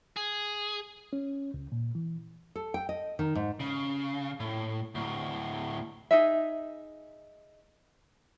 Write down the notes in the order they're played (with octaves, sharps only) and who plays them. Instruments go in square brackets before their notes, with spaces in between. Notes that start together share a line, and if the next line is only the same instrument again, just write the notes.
[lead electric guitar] G#4
[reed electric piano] C#4
C#2
A#2
E3
[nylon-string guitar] A4
G5
D#5
D#3
G#2
[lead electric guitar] C#3
A2
D2 A2
[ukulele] D#4 G#4 E5